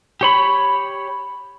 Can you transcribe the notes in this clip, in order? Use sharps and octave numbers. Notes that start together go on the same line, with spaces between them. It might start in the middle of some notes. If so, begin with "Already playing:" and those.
G4 C#5 B5